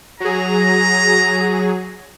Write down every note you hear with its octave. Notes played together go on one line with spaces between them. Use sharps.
F#3 G#4 A#5